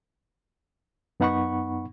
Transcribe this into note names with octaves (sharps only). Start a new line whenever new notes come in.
F#2 B3 D#4 F#5 B5 C#6